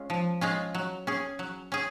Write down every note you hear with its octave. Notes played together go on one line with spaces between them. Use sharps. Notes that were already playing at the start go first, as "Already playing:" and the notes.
Already playing: G#3 C#4 F4
F3
G#3 C#4 F4
F#3
C#4 G#4
F#3
C#4 G#4